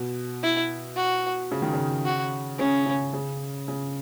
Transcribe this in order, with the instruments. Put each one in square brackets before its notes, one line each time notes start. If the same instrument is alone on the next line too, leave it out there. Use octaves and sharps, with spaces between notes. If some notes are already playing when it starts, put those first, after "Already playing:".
Already playing: [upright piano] B2
[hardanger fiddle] E4
F#4
[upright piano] C#3
D#3
C#3
[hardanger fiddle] F#4
[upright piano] C#3 [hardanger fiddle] C#4
[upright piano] C#3
C#3
C#3